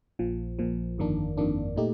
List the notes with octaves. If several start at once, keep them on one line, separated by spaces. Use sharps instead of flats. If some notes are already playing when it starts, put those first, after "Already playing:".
A#1 A#2 F3
A#1 A#2 F3
G1 F2 D#3 A#3 D4
G1 F2 D#3 A#3 D4
A#2 A3 D#4 G4